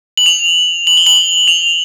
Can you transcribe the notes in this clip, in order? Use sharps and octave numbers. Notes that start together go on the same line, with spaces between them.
F#7
F7
F#7
G7
F#7
F7